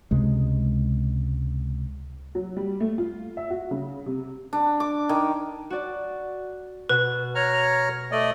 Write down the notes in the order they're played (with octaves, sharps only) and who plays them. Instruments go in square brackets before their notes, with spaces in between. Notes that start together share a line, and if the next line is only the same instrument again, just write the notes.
[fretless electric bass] C#2 C3 G#3
[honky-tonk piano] F#3
G3
A3
F4
E5
F#4
C#3
C3
[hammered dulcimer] D4
D6
D#3
[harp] F#4 D5
[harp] B2 [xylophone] B4
[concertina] C#5 A#5 F6
A3 D5 D#5